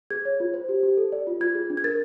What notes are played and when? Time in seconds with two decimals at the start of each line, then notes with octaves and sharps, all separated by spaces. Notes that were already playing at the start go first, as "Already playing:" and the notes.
0.10 G#4 G#6
0.25 C#5
0.40 F4
0.54 C5
0.69 G4
0.83 G4
0.97 A4
1.12 D5
1.27 F4
1.40 F4 G#6
1.55 G#4
1.70 D4
1.77 G#6
1.84 A#4 A6